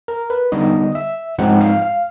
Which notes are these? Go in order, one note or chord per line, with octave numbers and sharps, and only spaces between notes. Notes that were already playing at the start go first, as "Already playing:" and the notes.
A#4
B4
D3 G3 B3 D#4 D#5
E5
G#2 F3 G#3 C4 D#4 F#5
F5
F5